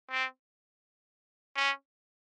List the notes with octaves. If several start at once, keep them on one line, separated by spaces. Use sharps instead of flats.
C4
C#4